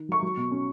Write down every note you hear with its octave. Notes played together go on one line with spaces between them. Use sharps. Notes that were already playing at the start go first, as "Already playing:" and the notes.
Already playing: D#3
F#3 C#6
F#3
B2
C#4